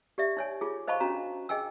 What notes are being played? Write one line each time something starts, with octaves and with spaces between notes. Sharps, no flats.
G4 D5 E5
D#4 C#5 G#5
F4 G#4
C5 D#5 F5 A5 B5 C#6
C#4 D4 F#4 A#5
G#4 D#5 G5 G#5 E6